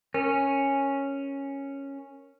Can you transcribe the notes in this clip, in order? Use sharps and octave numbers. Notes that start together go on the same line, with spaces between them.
C#4 A#4